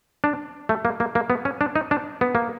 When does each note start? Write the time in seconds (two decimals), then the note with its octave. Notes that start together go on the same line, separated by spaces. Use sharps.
0.24 D4
0.69 A3
0.85 A#3
1.00 A#3
1.15 A#3
1.30 B3
1.45 C#4
1.61 D4
1.76 D#4
1.91 D4
2.21 B3
2.35 A#3